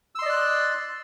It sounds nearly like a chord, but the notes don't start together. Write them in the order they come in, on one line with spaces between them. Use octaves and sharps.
E6 C6 D#5 D5 F#6